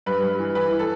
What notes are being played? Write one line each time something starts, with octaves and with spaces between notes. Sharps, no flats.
G2 B4
G2
E3
E3 B4
E3
A4